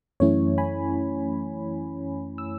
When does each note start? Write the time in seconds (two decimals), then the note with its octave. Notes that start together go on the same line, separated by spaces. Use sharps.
0.20 F#2 E3 A3 C#4 E4 C#5
0.58 G#5 B5
2.38 E6